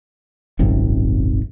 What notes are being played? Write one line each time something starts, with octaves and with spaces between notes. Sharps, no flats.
D#1 G#1 F#2 C3